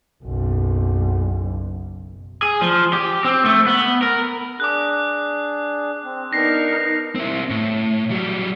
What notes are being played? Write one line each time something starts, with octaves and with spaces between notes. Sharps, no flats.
F#1 B1
G#4
F3
G4
C4
A3
B3
A#4
D4 G#4 D6 F#6
C4
B3 D4 D#4 A#4 A#6 C7
C4 E4
A2
F#3 G3